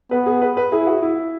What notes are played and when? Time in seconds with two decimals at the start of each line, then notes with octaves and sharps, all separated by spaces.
0.11 B3 B4
0.26 G#4
0.42 B4
0.57 B4
0.72 E4 G#4
0.87 F#4
1.02 E4